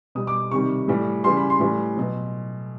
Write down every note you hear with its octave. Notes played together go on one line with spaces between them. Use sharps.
B2 G3 D#6
D6
C3 D#3 G3 C#6
A2 E3 G3
C#3 E3 G3 C6
B5
C6
A2 E3 G3
B2 F#3